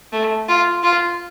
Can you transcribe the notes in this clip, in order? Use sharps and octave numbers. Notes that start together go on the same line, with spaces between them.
A3
F4
F4